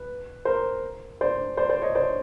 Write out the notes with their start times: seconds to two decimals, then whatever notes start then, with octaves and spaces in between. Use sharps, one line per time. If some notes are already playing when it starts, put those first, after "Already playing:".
Already playing: B4
0.45 A#4 C5
1.21 C5 D5
1.57 C5 D5
1.69 C5 D5
1.82 C#5 D#5
1.95 C5 D5